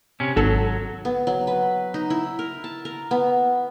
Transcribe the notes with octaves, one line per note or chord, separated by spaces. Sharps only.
C3 C#4
G#1 F#3 A4
B3
F#3
B4
D#4
E4
A#4
A5
A#4
B3